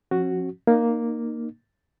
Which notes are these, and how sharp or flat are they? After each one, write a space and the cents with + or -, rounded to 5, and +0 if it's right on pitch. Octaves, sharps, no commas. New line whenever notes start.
F3 +20 C#4 -40 F#4 +0
A#3 +0 D#4 -30